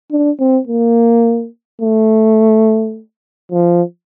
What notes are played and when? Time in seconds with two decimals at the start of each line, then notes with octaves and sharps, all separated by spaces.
0.11 D4
0.40 C4
0.68 A#3
1.81 A3
3.52 F3